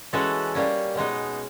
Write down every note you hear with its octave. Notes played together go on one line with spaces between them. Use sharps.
E3 G#3 C#4 F#4 A4
G3 A#3 C#4
B2 G#3 B3 D#4